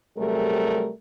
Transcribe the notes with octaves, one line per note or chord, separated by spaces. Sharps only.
C3 F#3 G3 A3 G#4 A#4